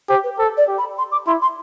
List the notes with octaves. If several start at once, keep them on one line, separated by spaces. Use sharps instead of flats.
G4 C5
B4
A4 C5
D5
G4
B5
C6
D6
E4 C6
C6